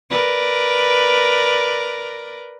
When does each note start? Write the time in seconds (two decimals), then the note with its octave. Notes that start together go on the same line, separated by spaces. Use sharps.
0.10 A#4 B4 D5